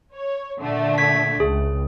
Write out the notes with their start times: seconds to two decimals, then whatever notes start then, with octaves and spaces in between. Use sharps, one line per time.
0.14 C#5
0.60 A#2 D3 A3
0.98 G#6 B6
1.40 C#2 G#4